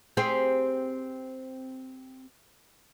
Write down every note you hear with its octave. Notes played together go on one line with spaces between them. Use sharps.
C4 G4 G#4